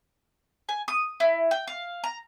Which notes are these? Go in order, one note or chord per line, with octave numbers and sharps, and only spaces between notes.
G#5
D#6
E4
G5
F5
A#5